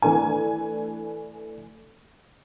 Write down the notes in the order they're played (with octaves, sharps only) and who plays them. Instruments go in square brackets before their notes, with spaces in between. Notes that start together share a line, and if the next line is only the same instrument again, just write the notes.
[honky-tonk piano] E3 A3 D4 G#5